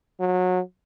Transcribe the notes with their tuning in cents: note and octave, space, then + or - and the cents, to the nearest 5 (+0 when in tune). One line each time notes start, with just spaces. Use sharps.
F#3 -25